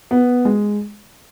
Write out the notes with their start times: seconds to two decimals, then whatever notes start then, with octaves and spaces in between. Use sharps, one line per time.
0.11 B3
0.45 G#3